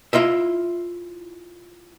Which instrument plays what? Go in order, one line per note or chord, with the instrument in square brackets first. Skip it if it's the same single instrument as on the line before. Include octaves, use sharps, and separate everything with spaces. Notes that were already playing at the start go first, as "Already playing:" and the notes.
[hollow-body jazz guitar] E4 F4 D#5 E5